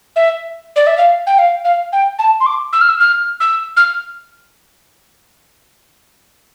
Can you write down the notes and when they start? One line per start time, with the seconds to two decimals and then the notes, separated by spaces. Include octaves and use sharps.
0.16 E5
0.76 D5
0.86 E5
0.97 F5
1.27 G5
1.38 F5
1.64 F5
1.92 G5
2.18 A5
2.40 C6
2.46 D6
2.73 E6
2.81 F6
2.89 E6
3.00 F6
3.40 E6
3.76 F6